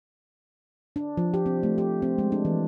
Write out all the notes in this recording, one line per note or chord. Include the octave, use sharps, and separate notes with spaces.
D4
F3
G4
C4
A3
G4
C4
G#3
D4
E3